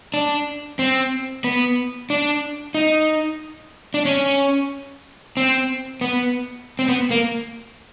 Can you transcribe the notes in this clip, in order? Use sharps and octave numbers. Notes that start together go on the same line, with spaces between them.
D4
C4
B3
D4
D#4
D4
C#4
C4
B3
C4
B3
A#3